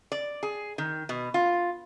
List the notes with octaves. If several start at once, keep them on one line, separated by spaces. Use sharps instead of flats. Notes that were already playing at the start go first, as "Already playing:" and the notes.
D5
G#4
D#3
B2
F4